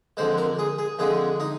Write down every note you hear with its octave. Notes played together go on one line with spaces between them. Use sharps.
F2 D3 G#3 C5
A#4
G#4
G#4
F2 D3 G#3 G#4
D#4